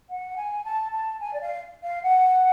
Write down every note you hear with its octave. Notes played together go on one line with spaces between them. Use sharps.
F#5
G#5
A5
A5
G#5
D5
F5
F5
F#5